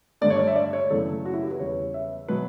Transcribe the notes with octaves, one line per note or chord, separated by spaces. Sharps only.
G2 D3 A3 D5
C#5
D5
E5
D5
C#5
F#2 C#3 E3 A3 A4
F#4
E4
G4
B4
E2 C#3 G3 C#5
E5
B2 F#3 B3 B4